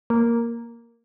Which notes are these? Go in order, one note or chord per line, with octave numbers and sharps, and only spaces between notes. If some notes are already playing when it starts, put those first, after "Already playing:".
A#3